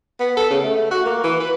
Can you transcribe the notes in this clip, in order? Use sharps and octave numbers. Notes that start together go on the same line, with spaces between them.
B3
A4
C#3
A3
F#4
A#3
E3
B4